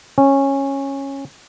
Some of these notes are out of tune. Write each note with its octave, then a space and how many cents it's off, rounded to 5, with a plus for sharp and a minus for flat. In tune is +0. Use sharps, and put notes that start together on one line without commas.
C#4 -15